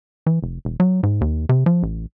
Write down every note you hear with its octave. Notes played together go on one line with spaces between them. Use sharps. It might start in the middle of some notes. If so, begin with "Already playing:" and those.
E3
F1
E1
F#3
G#2
D#2
C3
F3
A1